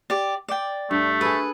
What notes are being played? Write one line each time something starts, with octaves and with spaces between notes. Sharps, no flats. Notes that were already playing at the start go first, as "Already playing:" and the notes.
G4 D5
D5 G5
G2 A3
G#4 A4 B4